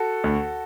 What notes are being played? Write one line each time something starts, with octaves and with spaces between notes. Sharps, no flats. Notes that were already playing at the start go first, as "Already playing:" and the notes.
Already playing: F#4 A4
D2